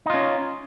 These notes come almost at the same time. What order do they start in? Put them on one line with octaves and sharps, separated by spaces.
D#4 F4 C#4